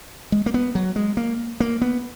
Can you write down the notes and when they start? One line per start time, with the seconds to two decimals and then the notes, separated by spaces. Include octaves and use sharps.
0.32 G#3
0.46 A#3
0.54 B3
0.75 F#3
0.96 G#3
1.17 A#3
1.60 A#3
1.81 B3